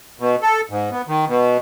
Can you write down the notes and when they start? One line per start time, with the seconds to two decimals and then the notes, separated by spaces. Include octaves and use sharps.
0.20 B2
0.42 A4
0.70 G#2
0.92 B3
1.08 D#3
1.27 B2